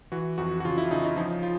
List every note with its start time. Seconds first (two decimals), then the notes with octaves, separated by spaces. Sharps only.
0.12 E3 F#4
0.38 F2 F#4
0.60 F#4
0.65 C#3 F4
0.78 E4
0.90 C#3 D#4
1.04 D#4
1.17 F3 D#4
1.43 F4